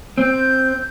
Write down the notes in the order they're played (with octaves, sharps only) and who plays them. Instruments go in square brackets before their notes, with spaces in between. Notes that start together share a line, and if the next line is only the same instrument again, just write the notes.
[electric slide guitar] C4 [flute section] G6